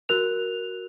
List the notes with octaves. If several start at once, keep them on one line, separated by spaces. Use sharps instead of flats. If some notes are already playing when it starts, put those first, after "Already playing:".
F#4 A#4 F#6 F7